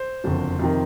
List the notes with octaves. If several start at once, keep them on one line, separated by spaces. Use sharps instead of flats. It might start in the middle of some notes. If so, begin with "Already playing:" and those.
Already playing: C5
F#1 F2 D3
F2 C3 D#3